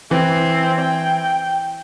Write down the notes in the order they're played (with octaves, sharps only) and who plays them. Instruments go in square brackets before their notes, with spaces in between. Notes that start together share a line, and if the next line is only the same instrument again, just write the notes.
[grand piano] E3 [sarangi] C4
[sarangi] G5